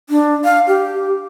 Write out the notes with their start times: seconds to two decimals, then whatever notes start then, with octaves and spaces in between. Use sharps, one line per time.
0.09 D4
0.44 F5
0.68 G4